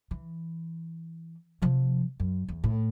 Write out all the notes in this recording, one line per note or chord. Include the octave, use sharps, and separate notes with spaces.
E3
C3 F3
F#2
E2
A2